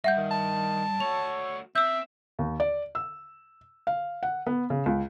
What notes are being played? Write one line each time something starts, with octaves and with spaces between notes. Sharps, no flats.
G2 E5 F#5 G6
D#3
A5
A3 F#4 C#5 F7
C4 E5 E6 G6
D#2
D5
E6
F5
F#5
B3
C#3
C#2